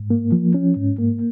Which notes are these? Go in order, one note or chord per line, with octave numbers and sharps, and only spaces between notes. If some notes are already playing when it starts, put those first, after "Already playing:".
Already playing: G#2
A#3
F3
C#4
G#2
A#3